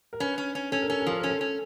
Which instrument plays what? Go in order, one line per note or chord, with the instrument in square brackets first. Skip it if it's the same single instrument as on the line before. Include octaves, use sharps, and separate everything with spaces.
[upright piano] A#4
[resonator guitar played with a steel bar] C#4 [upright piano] B4
[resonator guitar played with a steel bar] C#4
C#4
[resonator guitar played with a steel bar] C#4 [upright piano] A4
[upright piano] A#4
[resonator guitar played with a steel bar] C#4 [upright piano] A4
[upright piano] A#4
[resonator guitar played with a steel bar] F3 [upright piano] A4
[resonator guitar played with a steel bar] C#4 [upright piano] A#4
[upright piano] A4
[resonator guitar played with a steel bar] C#4